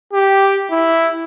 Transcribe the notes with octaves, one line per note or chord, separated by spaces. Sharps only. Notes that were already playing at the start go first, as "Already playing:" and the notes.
G4
E4